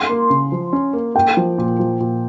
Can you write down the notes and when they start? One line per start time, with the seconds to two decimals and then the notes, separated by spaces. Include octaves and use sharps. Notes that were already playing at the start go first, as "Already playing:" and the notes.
Already playing: C6
0.09 A#3
0.30 C#3
0.52 F3
0.73 C#4
0.93 A#3
1.15 A#3 G5
1.37 F3
1.58 A#2
1.79 F3
2.00 A#2